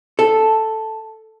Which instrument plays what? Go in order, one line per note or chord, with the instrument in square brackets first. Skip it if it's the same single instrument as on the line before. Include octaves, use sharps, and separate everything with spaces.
[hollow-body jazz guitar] A4